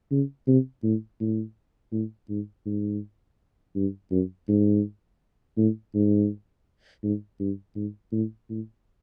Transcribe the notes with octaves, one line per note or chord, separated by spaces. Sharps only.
C#3
C3
A2
A2
A2
G#2
G#2
G2
F#2
G#2
A2
G#2
G#2
G2
G#2
A2
A2